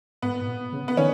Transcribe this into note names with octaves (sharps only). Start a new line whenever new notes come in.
G#2 B3
G#2
A#2
C#3
B3
D#3 C#4